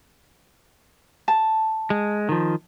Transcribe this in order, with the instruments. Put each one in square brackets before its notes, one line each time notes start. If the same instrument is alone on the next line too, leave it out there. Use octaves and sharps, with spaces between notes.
[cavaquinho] A5
[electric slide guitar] G#3
D#3 F3